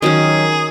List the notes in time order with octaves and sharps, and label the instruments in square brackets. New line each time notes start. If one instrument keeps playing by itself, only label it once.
[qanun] D#3 F#3 C#4 [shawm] G#4